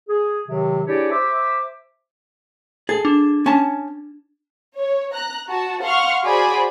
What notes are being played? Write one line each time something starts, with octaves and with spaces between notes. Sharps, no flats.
G#4
C3 D#3 F#3
D4 E4 G4 G#4 C#5 D5
C5 E5 D6
G#4 A4 G#6
D4
C#4 A5
C#5
A#5 F#6
F#4 A5
F5 F#5 C6 C#6 F6
F#4 G#4 C5 D5 G#5 B5